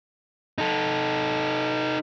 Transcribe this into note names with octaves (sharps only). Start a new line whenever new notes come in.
D#4 A4